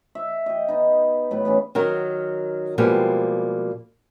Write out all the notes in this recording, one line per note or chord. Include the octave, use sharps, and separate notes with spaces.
E5
G4 D#5
B3 D#4
A2 F#3 B4
C#3 E3 B3
D#3 F#3 A#4
B2 F3 G3 G#3 A#3 G4